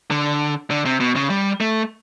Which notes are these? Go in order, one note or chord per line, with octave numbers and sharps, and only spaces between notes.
D3
D3
C3
B2
C#3
G3
A3